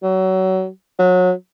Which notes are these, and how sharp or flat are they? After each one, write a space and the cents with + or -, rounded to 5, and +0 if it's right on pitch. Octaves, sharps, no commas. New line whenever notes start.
F#3 +25
F#3 -25